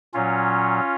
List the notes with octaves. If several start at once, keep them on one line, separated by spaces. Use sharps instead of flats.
A#2 F#3 C#4 F4